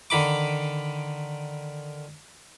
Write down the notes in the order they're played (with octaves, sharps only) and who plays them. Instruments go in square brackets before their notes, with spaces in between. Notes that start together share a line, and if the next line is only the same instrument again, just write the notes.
[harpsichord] D3 D#3 B5 D6